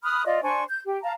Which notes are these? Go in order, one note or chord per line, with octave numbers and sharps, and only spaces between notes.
B5 D#6 F6 F#6
F4 D5 D#5
D4 C5 G#5 C#6
G6
G4
F5 A5 A#5